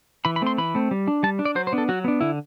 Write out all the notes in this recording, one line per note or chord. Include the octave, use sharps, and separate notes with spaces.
E3 B5
B5
A3 C4 C6
E3 B5
A3 C4
G3
D4
G3 A5
D4
D5
F#3 C5
C5
B3 D4
A4
F#3 F#4
B3 D4
D3 E4